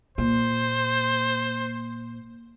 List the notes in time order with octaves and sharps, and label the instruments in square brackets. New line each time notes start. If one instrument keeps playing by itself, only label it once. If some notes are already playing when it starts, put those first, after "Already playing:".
[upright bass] A#2 [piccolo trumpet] C5